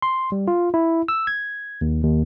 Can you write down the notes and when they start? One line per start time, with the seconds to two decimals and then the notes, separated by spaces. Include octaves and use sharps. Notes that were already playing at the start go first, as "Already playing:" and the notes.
0.02 C6
0.32 G3
0.48 F4
0.74 E4
1.08 E6
1.27 G#6
1.81 D#2
2.04 D#2